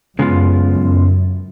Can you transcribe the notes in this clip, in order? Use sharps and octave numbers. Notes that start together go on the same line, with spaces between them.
F#2 C#3 G#3 B3 F4
F#2